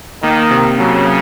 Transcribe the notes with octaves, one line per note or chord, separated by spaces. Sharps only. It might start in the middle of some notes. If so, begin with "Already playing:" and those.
D#3 A#3
C3
C#3 F#3